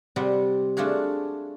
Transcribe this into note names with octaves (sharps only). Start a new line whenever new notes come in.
C3 G3 C4 D#5 F#5
A3 D4 F4 F#4 G#4